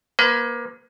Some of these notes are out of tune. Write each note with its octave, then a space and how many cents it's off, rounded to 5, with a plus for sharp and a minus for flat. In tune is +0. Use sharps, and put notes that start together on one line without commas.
A#3 +25 B4 +40